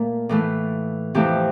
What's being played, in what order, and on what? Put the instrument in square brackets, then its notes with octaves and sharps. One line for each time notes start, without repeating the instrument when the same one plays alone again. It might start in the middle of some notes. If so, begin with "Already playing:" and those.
Already playing: [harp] A#2 A3 A#4
A2 E3 A3
F2 C3 E3 A3 G4